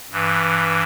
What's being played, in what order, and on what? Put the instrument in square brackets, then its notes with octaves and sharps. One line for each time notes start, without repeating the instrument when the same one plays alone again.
[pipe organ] G2 E3